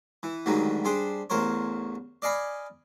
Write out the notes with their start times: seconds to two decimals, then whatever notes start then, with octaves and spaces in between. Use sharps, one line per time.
0.23 E3
0.46 D2 G#2 D#3 F#3 G3
0.85 G3 D4 G#4 C5
1.30 A1 E2 A#4 C5 C#5
2.22 D5 D#5 F5 G#5 B5